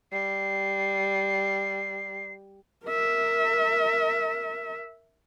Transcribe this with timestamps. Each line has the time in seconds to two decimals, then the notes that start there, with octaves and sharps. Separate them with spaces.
0.12 G3 C7
2.86 A#4 E5